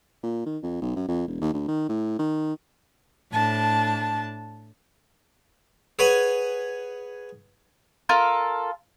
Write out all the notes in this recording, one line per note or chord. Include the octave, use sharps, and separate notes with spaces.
A#2
D#3
F2
B1
F#2
F2
E1
D#2
D2
D#3
A2
D#3
A2 D4 A5
G#4 B4 C#5 F#5 G#5
F4 A4 A#4